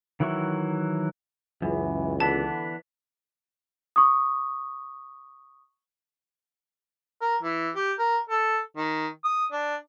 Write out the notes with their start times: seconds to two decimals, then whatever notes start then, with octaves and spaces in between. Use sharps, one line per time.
0.20 D#3 E3 F#3 E4 C#6
1.62 C#2 F#2 E3
2.20 D3 E3 B3 D4 A5
3.96 C#6 D#6
7.22 A#4
7.43 E3
7.76 G4
7.99 A#4
8.29 A4
8.77 D#3
9.25 D#6
9.52 D4